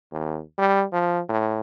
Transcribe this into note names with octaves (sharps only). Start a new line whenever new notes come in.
D#2
G3
F3
A2